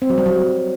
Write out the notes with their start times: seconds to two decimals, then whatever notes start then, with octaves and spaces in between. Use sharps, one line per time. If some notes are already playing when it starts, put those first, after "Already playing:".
0.02 C4
0.10 F#3
0.18 G3
0.26 F#3